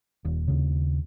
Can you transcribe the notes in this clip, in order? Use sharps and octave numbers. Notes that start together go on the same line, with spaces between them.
D#1
D#2 C#3